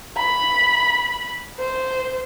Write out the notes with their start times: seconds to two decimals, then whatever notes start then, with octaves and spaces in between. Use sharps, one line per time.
0.18 B5
1.59 C5